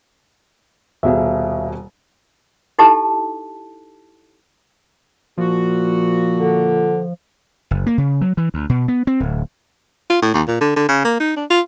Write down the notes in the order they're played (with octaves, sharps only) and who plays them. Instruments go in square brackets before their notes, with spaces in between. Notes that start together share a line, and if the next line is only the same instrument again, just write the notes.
[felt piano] D#1 B2 G#4 [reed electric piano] E5 F5
[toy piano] D#4 E4 G4 A4 A5
[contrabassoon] A#2 [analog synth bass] F3 [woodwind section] F#4
[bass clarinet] D3
[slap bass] F#1
A#3
C#3
F#3
E3
D2
B2
B3
C4
D1
[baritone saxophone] F4
A2
D#2
A#2
D3
D3
C#3
A#3
D#4
D4
F4